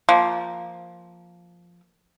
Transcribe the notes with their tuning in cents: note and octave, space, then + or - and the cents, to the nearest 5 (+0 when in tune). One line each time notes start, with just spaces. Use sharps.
F3 +0 A#3 +0